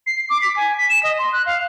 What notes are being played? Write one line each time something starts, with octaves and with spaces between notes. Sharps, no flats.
C7
D6
B6
G#5
B6
E7
D#5
C6
F#6
F5